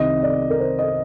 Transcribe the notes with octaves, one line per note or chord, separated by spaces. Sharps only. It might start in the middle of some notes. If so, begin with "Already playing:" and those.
Already playing: C2 C3 D#3 D#5
D5
A#4
C5
D#5